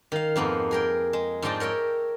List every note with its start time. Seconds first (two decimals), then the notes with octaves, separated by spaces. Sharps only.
0.12 D#3 F5
0.36 F2 G#2 A#3 B3
0.71 G#4 A#4 G5
1.13 G#3
1.42 G#2 F3 D4 D#4 G5 A5
1.60 A#4 C#5 E5 G5